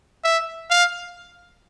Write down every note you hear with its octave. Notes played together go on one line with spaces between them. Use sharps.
E5
F5